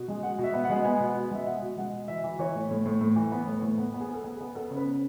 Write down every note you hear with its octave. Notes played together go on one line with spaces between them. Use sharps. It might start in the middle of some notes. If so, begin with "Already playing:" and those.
Already playing: B2
G#3
G#3 F#5
B2
E5
B3
F#5
G#3
B3 G#5
B2
B2
G#3 E5
B2 F#5
B2
G#3 F#5
B2
E3 E5
E3
E3 C#5
A2
A2
A2
A2
E3
B3
A2
A2
B3
B3
G#4
B3
A4
B3
G#4
B3
B3 A4
C#3
B4
C#3